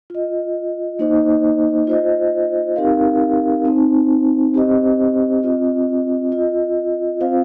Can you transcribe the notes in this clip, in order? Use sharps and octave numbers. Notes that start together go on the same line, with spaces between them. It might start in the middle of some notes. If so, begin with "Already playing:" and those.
F4 D#5
A#3 D#4 C5 D#5
F4 C5 D#5
C4 D#4 G4 A#4 F5
C4 D#4 C5
C4 G4 C5 D#5
C4 F4 D#5
F4 D#5
C4 F4 C5 F5